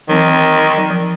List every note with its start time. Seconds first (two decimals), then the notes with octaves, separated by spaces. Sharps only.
0.09 D#3 E3 F#3 C4
0.78 F#3
0.90 F3